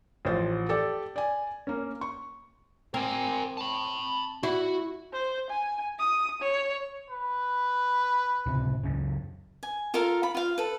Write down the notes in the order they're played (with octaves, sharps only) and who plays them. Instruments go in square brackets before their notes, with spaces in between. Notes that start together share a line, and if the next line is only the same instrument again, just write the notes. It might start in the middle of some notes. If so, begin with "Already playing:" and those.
[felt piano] A1 F3 C5 A6
G4 A4 D5
D5 G#5
A#3 C#4
C#6
[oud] C4 [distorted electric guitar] A#4 G#5
[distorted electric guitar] A5 B5
[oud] E4 [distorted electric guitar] F#4
[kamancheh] C5
G#5
D#6
C#5
[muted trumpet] B4
[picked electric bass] D1 C#2 C3
C#2 F#2 C#3
[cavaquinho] G#5
F4 A4 A#4 F5
B5
F4 F5
A4 B4